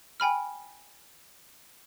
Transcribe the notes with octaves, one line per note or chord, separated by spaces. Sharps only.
G5 G#5 B5 F6